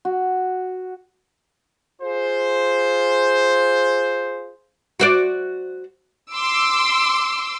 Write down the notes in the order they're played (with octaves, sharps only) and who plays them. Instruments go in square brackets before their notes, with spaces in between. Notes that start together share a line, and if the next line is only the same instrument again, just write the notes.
[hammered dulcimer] F#4
[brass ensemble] F4 G#4 C5
[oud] F#4 C5 D5
[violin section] C6 D6 E6